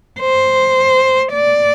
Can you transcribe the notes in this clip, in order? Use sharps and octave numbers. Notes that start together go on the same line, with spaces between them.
C5
D5